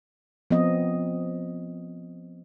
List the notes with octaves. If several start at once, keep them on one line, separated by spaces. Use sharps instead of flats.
F3 B3 C4 D#5